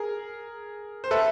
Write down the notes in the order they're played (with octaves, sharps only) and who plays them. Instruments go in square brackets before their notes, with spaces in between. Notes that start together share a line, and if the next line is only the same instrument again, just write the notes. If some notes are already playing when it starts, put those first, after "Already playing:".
Already playing: [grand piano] G#4 A#4
C5
[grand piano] A4 B4 [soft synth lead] E5